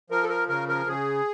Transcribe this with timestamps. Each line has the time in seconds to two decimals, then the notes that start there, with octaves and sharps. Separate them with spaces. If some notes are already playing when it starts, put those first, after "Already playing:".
0.10 F3 A#4
0.23 A4
0.29 A#4
0.48 C#3 A#4
0.68 A#4
0.87 C#3 G#4